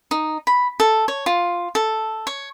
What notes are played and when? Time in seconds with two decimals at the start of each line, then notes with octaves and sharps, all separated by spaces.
0.11 D#4
0.47 B5
0.80 A4
1.08 C#5
1.26 F4
1.75 A4
2.27 C#5